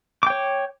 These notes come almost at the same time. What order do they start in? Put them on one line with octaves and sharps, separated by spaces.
D6 G5 C#5